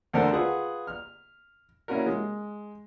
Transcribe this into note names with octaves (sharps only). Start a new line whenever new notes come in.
D2 D3 A4 A#4 C5
F4 G#4 B4 F#5
F6
A#3 C#4 E4 F#4 A#4
G#3